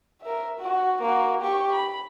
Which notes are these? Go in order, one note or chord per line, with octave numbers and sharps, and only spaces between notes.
A#4 E5
F#4
A#3 F#4
G4 C#6
B5